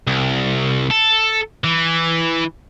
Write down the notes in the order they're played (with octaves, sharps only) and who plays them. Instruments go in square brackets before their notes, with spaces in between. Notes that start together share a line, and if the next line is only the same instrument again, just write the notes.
[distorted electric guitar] C2
A4
E3